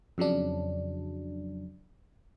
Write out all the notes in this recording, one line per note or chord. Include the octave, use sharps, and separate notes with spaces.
F2 C#3 F#3 D4